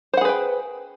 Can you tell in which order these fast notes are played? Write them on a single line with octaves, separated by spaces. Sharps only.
C5 F#5 G#4 B4 G5